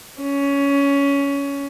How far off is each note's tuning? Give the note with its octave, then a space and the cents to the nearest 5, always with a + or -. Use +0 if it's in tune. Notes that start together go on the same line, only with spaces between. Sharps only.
C#4 +15